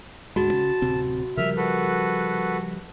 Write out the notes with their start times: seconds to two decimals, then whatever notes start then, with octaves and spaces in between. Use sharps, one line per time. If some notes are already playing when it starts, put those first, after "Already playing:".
0.36 D2 G#2 G#3 F#4 A5 B5
0.53 C#3
0.82 D1 C3 C4
1.37 C#3 F3 G3 A#4 E5 F6
1.57 F#4 A4 B4